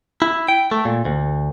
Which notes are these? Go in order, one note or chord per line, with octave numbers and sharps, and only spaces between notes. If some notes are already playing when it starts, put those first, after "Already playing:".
E4
G5
A3
A#2
D2